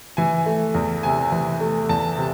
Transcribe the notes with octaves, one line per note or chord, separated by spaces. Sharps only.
E3 G#5
A3
E2
C3 G#5
E3
A3
E2 A5
C3